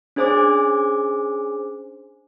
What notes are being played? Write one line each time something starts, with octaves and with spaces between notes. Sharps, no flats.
C#4 D4 G#4 C5 G#5 D6